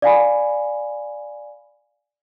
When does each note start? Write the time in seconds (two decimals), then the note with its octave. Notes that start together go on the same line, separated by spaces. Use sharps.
0.02 D5 F5 G#5 B5